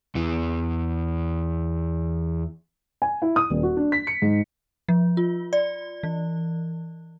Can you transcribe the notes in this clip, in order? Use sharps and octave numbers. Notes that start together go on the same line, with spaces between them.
E2 E3
G#5
E4
D#6
D#1
F#4
D4
B6
C#7
G#2
F3
F4
D5
E3